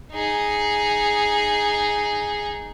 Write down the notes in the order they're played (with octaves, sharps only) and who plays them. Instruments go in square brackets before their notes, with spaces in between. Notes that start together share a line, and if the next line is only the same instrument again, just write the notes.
[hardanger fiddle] D#4 G#4